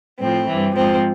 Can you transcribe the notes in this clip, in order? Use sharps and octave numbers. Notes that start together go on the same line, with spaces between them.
A2 F3 C4
G2 E3
G#2 F3 C4